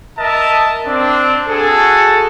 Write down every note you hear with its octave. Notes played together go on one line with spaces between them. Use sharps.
A#4 D#5 E5 A5
C4 D4
F#4 G#4 A4